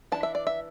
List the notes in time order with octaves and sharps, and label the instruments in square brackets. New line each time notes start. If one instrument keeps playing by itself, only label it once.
[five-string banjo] E3 D4 A5
E5
D5
E5